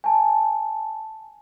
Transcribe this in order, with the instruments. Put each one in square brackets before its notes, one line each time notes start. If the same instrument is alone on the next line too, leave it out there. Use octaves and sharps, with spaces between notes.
[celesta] G#5 A5